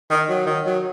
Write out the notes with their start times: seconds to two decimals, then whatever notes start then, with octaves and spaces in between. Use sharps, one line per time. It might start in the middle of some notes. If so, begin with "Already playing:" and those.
0.10 D#3
0.29 F#3
0.46 D#3
0.66 F#3